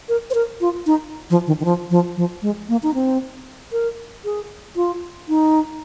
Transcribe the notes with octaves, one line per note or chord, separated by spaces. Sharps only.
A#4
C5
A#4
F4
D#4
F3
D#3
D#3
F3
F3
F3
G#3
A#3
D#4
C4
A#4
G#4
F4
D#4